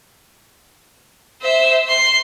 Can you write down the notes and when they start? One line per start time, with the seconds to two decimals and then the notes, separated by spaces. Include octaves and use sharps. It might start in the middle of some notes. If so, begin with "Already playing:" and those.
1.41 C5 E5
1.88 C6